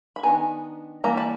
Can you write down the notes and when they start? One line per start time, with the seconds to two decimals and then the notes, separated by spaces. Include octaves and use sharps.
0.16 B5
0.23 D#3 F#3 B3 D4 G#5 A#5
1.04 E3 G3 A#3 A#5
1.17 A5 B5